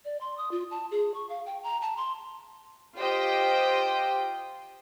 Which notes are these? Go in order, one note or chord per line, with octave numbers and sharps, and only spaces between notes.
D5
C6
D#6
F4
A5
G#4
C#6
F5
G5
A#5
A5
C6
F4 G4 C5 D#5 G5